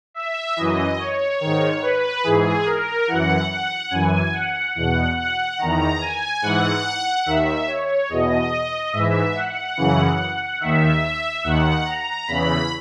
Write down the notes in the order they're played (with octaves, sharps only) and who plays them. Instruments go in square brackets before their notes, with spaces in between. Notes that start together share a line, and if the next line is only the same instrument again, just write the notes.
[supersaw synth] E5
F#2 E3 D#5
C#5
G#2 D#3
B4
G#2 E3 G#4
A#4
F#2 E3 F#5
F#5
F#2 E3 G#5
F#5
E2 B2 F#5
F#5
E2 D#3 A#5
G#5
G#2 E3 F#5
D#2 D#3 E5
C#5
E2 B2 D#5
G#2 E3 E5
F#5
F#2 C#3 E3
D#2 D#3 E5
D#2 D#3 F#5
A#5
E2 C#3 E3 B5